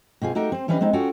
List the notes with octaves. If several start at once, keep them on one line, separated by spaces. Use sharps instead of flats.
B2 C4 F4 G#4
A3 D#4 F#4 G4 A#4 G5
C4 C5
E3 G3 C#4 D4 B4 D#5
G#3 B3 C4 D#4
C#4 F4 F#4 A4 G5